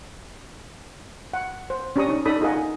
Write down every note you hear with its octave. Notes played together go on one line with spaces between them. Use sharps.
F#5
C5
C#4 D4 G4 A#5 C#6 D#6
D#4
D4 D#4 A4 D5 B5 D#6
D#4 F4 G#4 A#4 D#5 F#5